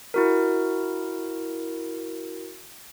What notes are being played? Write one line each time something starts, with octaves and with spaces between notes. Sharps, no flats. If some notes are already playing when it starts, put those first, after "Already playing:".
E4 F#4 A#4